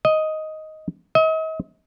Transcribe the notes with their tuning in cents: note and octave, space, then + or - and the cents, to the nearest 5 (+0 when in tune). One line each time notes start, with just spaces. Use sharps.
D#5 +5
D#5 +40